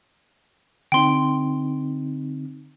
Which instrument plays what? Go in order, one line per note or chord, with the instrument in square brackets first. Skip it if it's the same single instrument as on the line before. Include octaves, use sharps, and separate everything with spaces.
[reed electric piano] D3 C4 D#4 [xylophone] G5 C6